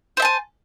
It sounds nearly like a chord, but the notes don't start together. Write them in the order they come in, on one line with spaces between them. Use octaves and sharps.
C5 E5 A5 G#5